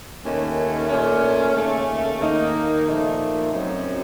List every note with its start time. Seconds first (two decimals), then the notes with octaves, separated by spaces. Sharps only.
0.23 D#2 D#3 A3 C#4
0.89 A#2 A3 C#4
1.55 D#2 C#3 A3 C#4
2.20 D#2 D#3 A#3 D#4
2.86 A#2 F3 A3 D#4
3.52 F#2 C#3 F#3 C4 D#4